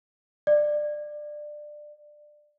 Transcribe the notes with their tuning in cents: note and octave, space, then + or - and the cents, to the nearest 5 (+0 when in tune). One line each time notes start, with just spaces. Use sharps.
D5 +20